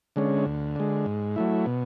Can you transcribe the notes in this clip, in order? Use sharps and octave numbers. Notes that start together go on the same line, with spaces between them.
D3 G#3 C#4
D2
D3 G#3
G#2
F#3 A3 E4
B2